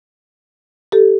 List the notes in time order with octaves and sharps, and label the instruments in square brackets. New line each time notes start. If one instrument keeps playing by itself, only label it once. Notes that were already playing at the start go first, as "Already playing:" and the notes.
[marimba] G4 A4